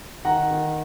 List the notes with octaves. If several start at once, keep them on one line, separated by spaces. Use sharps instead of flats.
D#3 F#5 A#5
D#3